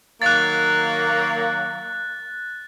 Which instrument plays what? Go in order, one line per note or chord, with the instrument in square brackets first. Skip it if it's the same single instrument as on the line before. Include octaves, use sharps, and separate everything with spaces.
[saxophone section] D#3 F#3 A#3 [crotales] F#6 A6